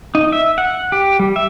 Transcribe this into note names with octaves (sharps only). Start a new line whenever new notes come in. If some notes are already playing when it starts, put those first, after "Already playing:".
D#4
E5
F#5
G4
G3
E5